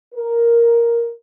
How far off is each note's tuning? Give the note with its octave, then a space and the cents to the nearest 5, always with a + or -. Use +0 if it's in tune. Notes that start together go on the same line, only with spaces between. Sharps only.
A#4 +5